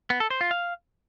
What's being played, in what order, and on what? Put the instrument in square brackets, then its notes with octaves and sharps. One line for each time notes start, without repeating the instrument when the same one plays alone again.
[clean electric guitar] B3
A4
C5
F4
F5